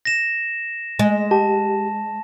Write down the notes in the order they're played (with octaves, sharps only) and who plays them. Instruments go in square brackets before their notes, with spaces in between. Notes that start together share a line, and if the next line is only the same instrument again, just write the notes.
[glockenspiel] A#6 E7
[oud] G#3
[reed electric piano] G4 [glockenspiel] A5